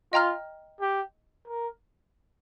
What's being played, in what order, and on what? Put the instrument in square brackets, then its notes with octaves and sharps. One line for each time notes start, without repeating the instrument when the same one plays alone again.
[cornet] F4 [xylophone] D#5 G5 A#5 F6
[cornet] G4
A#4